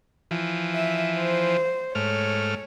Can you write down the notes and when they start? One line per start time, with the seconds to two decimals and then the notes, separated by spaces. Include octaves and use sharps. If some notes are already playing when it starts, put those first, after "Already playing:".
0.31 E3 F3
0.75 E5
1.18 C5
1.95 G#2 A3 C#5 F6